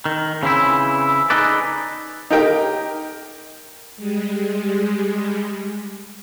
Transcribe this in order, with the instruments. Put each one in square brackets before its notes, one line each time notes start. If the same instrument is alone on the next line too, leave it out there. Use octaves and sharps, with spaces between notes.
[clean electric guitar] D#3
C#3 E3 C4 E4
D#4 G#4 A4 B4 D5
[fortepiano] D#4 G4 A#4 G5
[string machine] G3 G#3